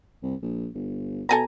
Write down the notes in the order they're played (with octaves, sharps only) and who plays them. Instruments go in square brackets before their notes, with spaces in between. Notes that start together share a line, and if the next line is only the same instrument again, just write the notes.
[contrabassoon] C2
A#1
G1
[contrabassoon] B2 [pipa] A4 G#5 A#5